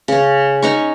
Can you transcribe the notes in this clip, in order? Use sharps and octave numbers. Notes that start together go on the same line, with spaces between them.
C#3 C#4
C#4 D#4 C#6